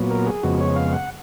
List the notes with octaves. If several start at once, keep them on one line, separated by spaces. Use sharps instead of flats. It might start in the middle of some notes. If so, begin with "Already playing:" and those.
Already playing: A#2 F#3 B3
A#4
G#4
F2 C#3 G#3 B3 F#4
C#5
F5
F#5